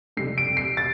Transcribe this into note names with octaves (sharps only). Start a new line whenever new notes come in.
F2 C3 G3 C7
D7
C7
A6